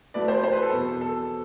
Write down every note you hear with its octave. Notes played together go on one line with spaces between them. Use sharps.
F#3 A3 E4 B4 D5
C5
C5
B4
A4
E2 B2 F#3
A4